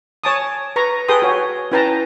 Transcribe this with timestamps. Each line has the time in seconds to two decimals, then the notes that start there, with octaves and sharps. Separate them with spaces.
0.24 C#5 G#5 A5 D6 D#6
0.76 B4 A#5 C#6
1.08 G#4 A4 B4 G5 C6 D#6
1.22 F#4 C#5
1.72 C#4 E4 B4 G5 A5 A#5